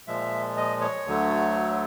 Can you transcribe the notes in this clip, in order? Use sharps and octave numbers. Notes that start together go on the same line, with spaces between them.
A#2 F3 G#3 E5
D#5
C#5
D2 D3 F#3 A3